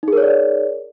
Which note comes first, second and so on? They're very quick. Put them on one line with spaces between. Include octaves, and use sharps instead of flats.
D#4 G#4 A#4 C#5 D5